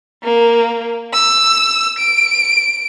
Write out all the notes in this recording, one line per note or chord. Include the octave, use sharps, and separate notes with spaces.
A#3
E6
D7